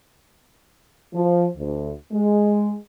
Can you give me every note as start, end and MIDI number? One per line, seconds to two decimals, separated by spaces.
1.15 1.46 53
1.57 1.91 38
2.12 2.76 56